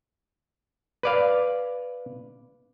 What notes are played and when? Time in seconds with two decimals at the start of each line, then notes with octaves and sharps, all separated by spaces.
1.03 B4 D5 F5